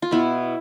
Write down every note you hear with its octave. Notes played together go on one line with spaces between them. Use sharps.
F4
B2 B3 E4